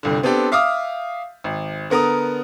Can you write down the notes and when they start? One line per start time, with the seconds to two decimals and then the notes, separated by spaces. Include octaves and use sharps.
0.03 G1 C2 D3
0.23 B3 C4 D4 G4 A4
0.52 E5 F5 D6 D#6 F6
1.44 G#1
1.90 D3 B3 A#4 A#5 D#6